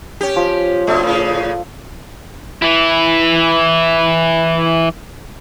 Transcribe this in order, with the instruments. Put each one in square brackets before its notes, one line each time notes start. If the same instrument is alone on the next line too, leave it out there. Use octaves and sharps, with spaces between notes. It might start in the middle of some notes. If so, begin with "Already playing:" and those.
[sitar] C#4 G4
[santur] F3
[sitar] B2 A3 [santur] D4 A4 C5
[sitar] A2 C#3
[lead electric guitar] E3 E4